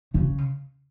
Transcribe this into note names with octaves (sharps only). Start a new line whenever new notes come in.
C#3